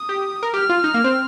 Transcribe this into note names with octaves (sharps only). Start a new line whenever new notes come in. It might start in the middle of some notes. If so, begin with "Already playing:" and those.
Already playing: D#6
G4
A#4
G4 F6
F4
D#4
A#3
C4